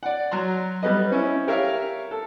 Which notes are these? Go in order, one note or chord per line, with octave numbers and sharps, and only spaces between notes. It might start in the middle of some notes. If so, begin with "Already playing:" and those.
D5 F#5
F#3 A#5 C6
G3 B3 B4 D#5
C4 C#4 E4
G4 A#4 C#5 E5 F5
A4